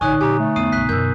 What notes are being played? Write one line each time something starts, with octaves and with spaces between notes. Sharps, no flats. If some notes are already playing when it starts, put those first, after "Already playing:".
A1 D3 D#4 C#5 G#5 C#6 D#6 F#6
A#2 F3 G4 G#5 A#5
A3
E2 B3 D#6 C7 D#7
C2 F#2 B2 F#6 B6
F#2 B2 A#4 E6 G6